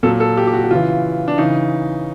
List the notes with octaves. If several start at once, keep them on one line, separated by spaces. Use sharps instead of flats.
A#2 F#3 A4
A4
G4
G4
F#4
F#4
C#3 E3 F4
D4
C#3 E3 D#4